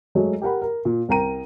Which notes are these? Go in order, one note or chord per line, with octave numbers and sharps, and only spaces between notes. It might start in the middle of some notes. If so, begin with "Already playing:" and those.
F#3 G#3 A3 C#5
G4 A#4 F#5 B5
A#4
A#2
C2 A#4 G5 A#5 D#7